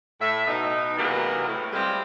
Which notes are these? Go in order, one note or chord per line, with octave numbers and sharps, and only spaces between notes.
A2 E5
B2 D#4
C3 E3 F#3 G#3 A#3 B3
A2
G3 G#3 C4 E4 F4 G4